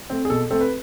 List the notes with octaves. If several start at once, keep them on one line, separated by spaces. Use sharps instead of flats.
A3 C4
G#4
B2 A4
A3 C4 A4
B4